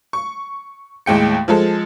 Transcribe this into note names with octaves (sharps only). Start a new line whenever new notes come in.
C#6
D#2 A2 G#3 G5 C#7
F3 G#3 A4